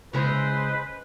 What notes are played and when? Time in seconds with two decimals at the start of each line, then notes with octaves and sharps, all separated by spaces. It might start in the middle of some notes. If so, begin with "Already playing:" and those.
0.14 C#3 G#3 E4 B4 C5